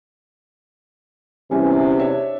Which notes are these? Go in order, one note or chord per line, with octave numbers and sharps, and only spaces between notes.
E2 C3 E3 G3 C#4
D4 C#5 E5